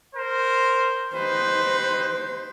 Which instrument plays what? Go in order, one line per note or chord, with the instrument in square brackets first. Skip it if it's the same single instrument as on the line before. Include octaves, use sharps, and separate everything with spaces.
[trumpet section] A#4 C5
[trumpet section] D#4 G4 B4 [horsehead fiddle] C5